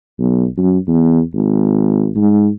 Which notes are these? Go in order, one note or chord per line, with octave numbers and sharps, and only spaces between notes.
B1
F#2
E2
G#1
G#2